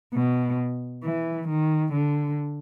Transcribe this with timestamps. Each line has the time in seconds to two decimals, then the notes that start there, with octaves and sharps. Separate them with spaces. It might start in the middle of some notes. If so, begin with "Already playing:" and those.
0.14 B2
1.03 E3
1.48 D#3
1.92 D3